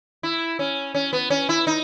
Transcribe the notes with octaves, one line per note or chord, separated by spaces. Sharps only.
E4
C#4
C#4
B3
C#4
E4
D#4